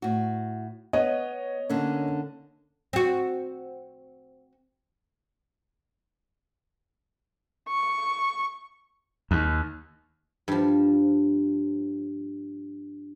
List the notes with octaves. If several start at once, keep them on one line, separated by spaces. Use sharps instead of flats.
A2 F#4
B3 C#5 D#5
D3 A#3 C#4
C4 F#4
C#6
D#2
G2 F3